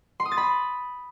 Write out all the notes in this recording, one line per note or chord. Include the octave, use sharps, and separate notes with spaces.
C6
D#6
A6
B5